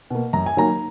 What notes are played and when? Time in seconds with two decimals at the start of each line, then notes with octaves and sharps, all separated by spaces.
0.10 B2 A#3
0.33 F#2 A#5
0.46 G#5
0.56 D#3 F#3 A#3 A#5